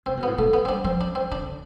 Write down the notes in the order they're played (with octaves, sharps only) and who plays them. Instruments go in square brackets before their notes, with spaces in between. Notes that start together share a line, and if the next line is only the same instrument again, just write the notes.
[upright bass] C3 [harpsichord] C4
[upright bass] B2
[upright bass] A2 [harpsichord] B3
[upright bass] B2 [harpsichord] A3
[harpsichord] B3
C4
[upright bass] G3 [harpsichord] D4
[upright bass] F3 [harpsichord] C4
[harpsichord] D4
C4
[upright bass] D3 [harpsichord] D4